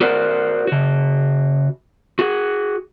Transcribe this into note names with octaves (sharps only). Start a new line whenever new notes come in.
F#4 A#4 C5 D5
C#3 F#4
F#4 G#4